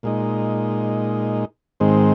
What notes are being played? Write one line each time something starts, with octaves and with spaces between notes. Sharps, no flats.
A#2 G#3 D#4
G#2 D#3 G#3 C4